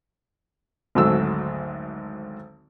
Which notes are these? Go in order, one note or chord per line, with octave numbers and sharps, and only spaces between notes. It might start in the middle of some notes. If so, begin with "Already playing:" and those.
G#1 D2 G#2 F#3 A4 E6